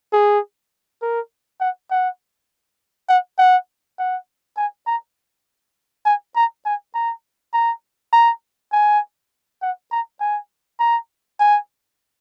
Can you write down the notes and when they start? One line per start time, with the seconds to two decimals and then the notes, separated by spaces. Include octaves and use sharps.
0.12 G#4
1.02 A#4
1.60 F#5
1.91 F#5
3.09 F#5
3.39 F#5
3.99 F#5
4.57 G#5
4.87 A#5
6.05 G#5
6.36 A#5
6.65 G#5
6.94 A#5
7.53 A#5
8.13 A#5
8.72 G#5
9.62 F#5
9.92 A#5
10.20 G#5
10.79 A#5
11.40 G#5